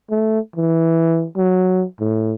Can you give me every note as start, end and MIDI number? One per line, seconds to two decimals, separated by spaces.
0.11 0.39 57
0.56 1.26 52
1.37 1.85 54
2.01 2.34 45